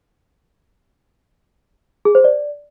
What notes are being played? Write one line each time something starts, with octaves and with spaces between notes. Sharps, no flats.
G#4
C5
D5